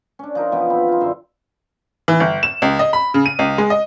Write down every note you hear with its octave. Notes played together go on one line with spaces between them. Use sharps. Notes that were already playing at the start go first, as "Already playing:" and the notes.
C#4 D4
F3 D#4 A#4
B2 E3 F3 B3
C4 B5
D#4 F4
F#2 D3 E5 C6
E3
G1
E7
C#2
D#5
B5
C#3
D#7
C#2
G#3
D#5